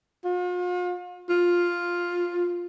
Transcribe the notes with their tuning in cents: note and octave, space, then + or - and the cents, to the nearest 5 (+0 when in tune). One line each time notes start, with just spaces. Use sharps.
F4 +45
F4 +5